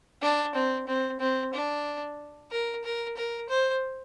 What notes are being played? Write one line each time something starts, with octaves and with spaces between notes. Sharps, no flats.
D4
C4
C4
C4
D4
A#4
A#4
A#4
C5